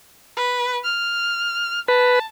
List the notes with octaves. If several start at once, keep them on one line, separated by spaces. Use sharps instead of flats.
B4
F6
B4 A5